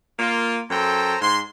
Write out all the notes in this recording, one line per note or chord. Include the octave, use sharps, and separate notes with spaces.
A#3 F4
F#2 A4 C5 G5 A#5
G#2 C6